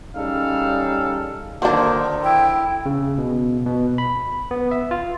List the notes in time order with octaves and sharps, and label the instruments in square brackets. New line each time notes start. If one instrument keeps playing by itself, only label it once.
[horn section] G3 C#4 D#4 G#4 A4 F5
[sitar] D3 D#3 C5 [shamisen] F#3 D4 [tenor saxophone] A#3
[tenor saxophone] E4 [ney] G5
[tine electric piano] C#3
B2
B2
B5
B3
E5
F4